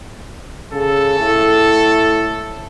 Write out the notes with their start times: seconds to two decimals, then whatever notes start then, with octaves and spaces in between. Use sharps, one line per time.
0.73 C#3 A4
1.19 A2